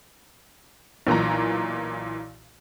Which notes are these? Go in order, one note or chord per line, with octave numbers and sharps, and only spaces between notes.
B1 A#2 E3 A#5